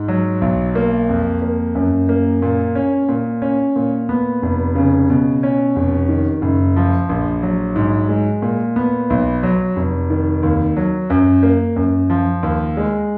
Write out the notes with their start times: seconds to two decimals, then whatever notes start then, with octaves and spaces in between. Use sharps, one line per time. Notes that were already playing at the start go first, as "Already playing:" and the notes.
Already playing: G#2
0.08 F#3
0.41 B1
0.75 A#3
1.09 F2
1.42 A#3
1.75 F#2
2.09 A#3
2.42 A#2
2.75 C#4
3.09 A#2
3.42 C#4
3.76 A#2
4.09 B3
4.42 F1
4.75 C#3
5.10 B2
5.43 C#4
5.76 F1
6.09 D#3
6.42 F#1
6.76 F3
7.09 A#1
7.43 F#3
7.76 G#2
8.09 G#3
8.42 A#2
8.76 B3
9.10 B1
9.43 F#3
9.76 F1
10.10 D#3
10.43 D#2
10.76 F#3
11.10 F#2
11.43 A#3
11.76 F#2
12.10 F3
12.43 D#2
12.77 G#3